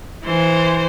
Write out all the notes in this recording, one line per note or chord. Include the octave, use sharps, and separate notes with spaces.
E3 C5